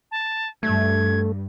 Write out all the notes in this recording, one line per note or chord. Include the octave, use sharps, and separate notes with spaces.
A5
G2 A3 G#6